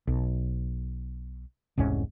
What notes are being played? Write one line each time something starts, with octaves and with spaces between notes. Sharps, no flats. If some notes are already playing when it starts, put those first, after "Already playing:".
B1
E1 C2 G#2 C#4